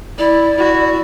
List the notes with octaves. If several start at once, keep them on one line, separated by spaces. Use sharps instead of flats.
E4 D5
E4 F#4